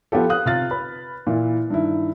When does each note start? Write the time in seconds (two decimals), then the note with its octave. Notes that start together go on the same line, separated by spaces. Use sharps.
0.12 F3 B3 F4 G4 A4
0.29 F5 D#6 F#6
0.46 C3 F4 F6 A6
0.71 B4 B5
1.27 A#2 E3 E4
1.70 G2 D#3 E4